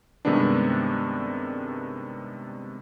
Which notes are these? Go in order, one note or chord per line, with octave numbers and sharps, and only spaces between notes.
G2 C3 D#3 G#3 B3 D4